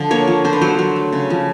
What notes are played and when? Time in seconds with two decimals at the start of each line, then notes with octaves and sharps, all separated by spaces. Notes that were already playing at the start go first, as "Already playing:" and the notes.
Already playing: D3 F3
0.11 A#3 C#5
0.27 F3
0.45 D3 C5
0.53 B4
0.61 F#3 C5
0.79 F#3
0.96 A3
1.12 C#3
1.30 F3